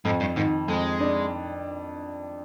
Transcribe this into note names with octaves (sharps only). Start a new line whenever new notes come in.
F2 G#2
G2
G#2 D#3
F2 G#3
D4